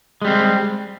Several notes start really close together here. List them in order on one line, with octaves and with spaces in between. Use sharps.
G#3 G3 C4